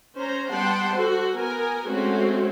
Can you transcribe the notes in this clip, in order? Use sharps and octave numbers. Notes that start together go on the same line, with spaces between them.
C#4 C5 A#5
G3 B3 F#5 G5 A5 C6
F#4 A4 C5
B3 A#4 G#5
G#3 A3 C4 C#4 F#4